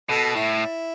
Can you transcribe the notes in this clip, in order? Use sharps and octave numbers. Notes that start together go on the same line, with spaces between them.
B2 A4
A2 E4